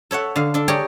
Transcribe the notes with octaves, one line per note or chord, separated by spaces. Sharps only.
A4 C#5 E5 F#5
D3 F5
D4 A4
G4 G#4 A#4 C#5 D5 G5